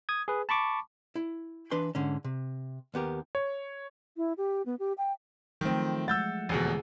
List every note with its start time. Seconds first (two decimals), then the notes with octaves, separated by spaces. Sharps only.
0.09 D#6 G#6
0.28 G#4 B4
0.49 A5 B5 C#6 D6
1.16 E4
1.71 E3 D4 B4 C6
1.95 G#2 D3 C#4
2.25 C3
2.94 D#2 B3 G4 A#4
3.35 C#5
4.17 E4
4.38 G4
4.66 B3
4.79 G4
4.98 G5
5.61 D#3 F3 F#3 A3 C4
6.08 G#3 F#5 E6 G6 A6
6.49 F1 E2 B2 D3 F3 G#4